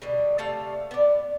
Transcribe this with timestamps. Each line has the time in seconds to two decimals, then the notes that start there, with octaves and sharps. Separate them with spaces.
0.02 B2 D3 G3
0.38 C3 A3 F5 A5
0.91 B3 D5